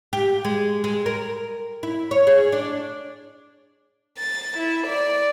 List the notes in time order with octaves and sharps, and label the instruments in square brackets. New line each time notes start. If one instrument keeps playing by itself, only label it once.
[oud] G4
G#3
G#3
A#4
E4
C#5
G#4
D4
[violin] A6
E4
D5